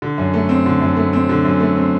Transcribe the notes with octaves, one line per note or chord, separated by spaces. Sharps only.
D3
F#2
A3
C4
D3
F#2
A3
C4
D3
F#2
A3
C4